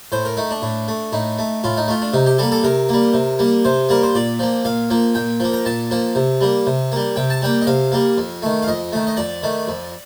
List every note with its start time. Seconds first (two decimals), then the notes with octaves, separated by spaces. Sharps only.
0.12 A2 C5
0.25 A#4
0.37 A3 D#4
0.51 D4
0.62 A2
0.88 A3
1.12 A2 D#4
1.39 A3
1.64 A2 F4
1.77 D#4
1.88 A3 F4
2.02 D4
2.13 C3 D#4
2.27 G4
2.38 G3 A#3 A4
2.52 A4
2.63 C3 A#4
2.89 G3 A#3
3.14 C3
3.39 G3 A#3
3.65 C3 C5
3.89 G3 A#3 A#4
4.03 C5
4.15 A#2 D5
4.39 F3 A#3
4.65 A#2 F5
4.90 F3 A#3
5.15 A#2 G5
5.40 F3 A#3
5.53 A#5
5.65 A#2 A5
5.91 F3 A#3
6.15 C3
6.41 G3 A#3
6.66 C3
6.92 G3 A#3
7.16 C3 G5
7.30 A5
7.42 G3 A#3 G5
7.62 D#5
7.67 C3 F5
7.92 G3 A#3
8.17 F2
8.42 D#3 A3
8.62 F5
8.67 F2 D#5
8.92 D#3 A3
9.07 D#5
9.17 F2 D5
9.43 D#3 A3
9.68 F2